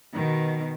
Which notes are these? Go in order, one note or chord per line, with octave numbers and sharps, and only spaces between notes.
B2 D#3